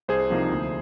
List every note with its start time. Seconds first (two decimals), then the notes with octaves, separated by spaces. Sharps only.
0.08 C2 G#4 C5
0.30 C3 F3 A#3 D#4
0.50 D2